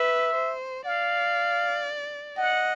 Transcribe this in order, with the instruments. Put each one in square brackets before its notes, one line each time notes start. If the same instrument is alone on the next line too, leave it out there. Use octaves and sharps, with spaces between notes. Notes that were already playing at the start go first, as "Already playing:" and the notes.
Already playing: [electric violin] B4 [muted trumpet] E5
[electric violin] C5
[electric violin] D5 [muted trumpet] F5
[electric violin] D#5 [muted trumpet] F#5